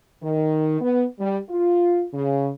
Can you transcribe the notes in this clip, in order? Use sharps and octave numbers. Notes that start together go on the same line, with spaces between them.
D#3
B3
G3
F4
C#3